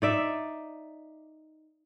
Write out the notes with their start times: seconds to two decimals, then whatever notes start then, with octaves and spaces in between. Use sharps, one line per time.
0.02 D#4 D5 E5